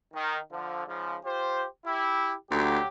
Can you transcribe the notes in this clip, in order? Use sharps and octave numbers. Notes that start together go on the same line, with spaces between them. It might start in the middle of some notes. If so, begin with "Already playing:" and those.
D#3
D3 F3
G#2 C#3 F3
F4 G4 C5
E4 G4
D2 F#3 G4